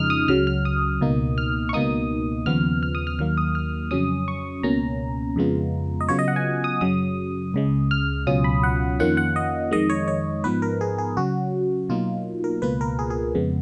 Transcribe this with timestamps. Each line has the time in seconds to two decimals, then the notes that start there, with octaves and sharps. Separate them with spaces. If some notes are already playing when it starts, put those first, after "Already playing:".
Already playing: F2 C#3 F3 G#3 D#4 D#6 F6
0.10 D#6
0.28 C#2 C#3 F#3 F6
0.47 F6
0.65 D#6
1.01 C#2 B2 A#3 D#4
1.38 F6
1.69 C#6
1.73 C#2 B2 A#3 D#4 D#6
2.46 D#2 C#3 F3 B3 F6
2.83 F6
2.95 D#6
3.07 F6
3.18 D#2 D#3 F#3 A#3 F6
3.37 D#6
3.55 F6
3.91 F2 C#3 F#3 C#4 D#6
4.28 C#6
4.63 C#2 B2 A#3 C#4 A#5
5.36 F2 C#3 G#3 B3 F4
6.01 D#5
6.09 C#3 F#3 B3 F4 C#5
6.19 D#5
6.28 F#5
6.36 G#5
6.64 D#6
6.81 F#2 C#3 F#3 D#6
7.54 C#2 C#3 G#3
7.91 F6
8.27 C#2 B2 F#3 C#4 F4 D#6
8.44 B5
8.63 F#5
9.00 F2 D#3 A#3 C#4 F4 F#5
9.17 F#5
9.36 D#5
9.71 F2 D#3 G#3 D#5
9.90 C#5
10.08 C#5
10.44 G#2 F3 B3 D#4 B4
10.62 A#4
10.81 G#4
10.98 G#4
11.17 C#3 F#3 C#4 F#4
11.89 B2 F#3 A#3 D#4 F4
12.44 A#4
12.62 C#2 B2 A#3 F4 B4
12.81 A#4
12.99 G#4
13.10 G#4
13.35 F2 C#3 G#3 B3